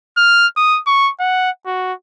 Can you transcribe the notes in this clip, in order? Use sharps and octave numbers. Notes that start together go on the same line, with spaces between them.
F6
D#6
C#6
F#5
F#4